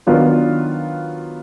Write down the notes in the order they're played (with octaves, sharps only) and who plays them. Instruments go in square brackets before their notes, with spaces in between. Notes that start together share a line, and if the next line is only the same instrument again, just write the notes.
[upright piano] D#3 F#3 B3 D4 F4